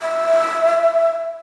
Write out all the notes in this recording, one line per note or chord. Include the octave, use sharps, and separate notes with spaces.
E5